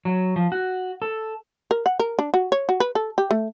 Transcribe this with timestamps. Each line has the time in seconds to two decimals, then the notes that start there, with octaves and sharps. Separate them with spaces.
0.05 F#3
0.36 F3
0.52 F#4
1.02 A4
1.71 A#4
1.86 F#5
1.99 A#4
2.19 D4
2.34 F#4
2.52 C#5
2.69 F#4
2.80 B4
2.95 A4
3.18 G4
3.31 A3